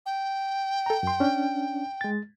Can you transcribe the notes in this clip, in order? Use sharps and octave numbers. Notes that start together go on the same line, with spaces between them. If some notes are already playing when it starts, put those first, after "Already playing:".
G5
A4 A#5
F#2 C6
C#4 D4
G#3 A6